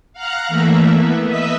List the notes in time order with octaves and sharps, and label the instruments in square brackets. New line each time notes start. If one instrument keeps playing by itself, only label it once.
[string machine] F5 F#5 A#5 F6 F#6
E3 A3 A#3 E5
B3
B4 D#5 E5 E6 B6